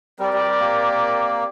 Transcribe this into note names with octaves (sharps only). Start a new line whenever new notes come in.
G3 C4 G4 A#4 D5
G3
G3
A#3